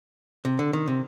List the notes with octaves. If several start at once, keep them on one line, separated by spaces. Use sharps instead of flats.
C3
D3
D#3
C3